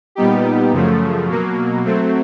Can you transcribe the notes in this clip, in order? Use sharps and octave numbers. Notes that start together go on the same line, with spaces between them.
A#2 G3 B3 D#4 G4
F#2 C#3 F3 A3
B2 F#3 A#3
F#3 A3 C4